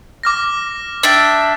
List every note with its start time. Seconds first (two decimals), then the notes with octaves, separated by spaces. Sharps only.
0.23 D6 F6 A#6
1.03 D4 E5 G5